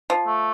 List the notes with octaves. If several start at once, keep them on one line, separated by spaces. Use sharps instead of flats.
F3
A3